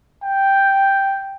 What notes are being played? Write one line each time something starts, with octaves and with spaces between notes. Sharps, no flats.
G5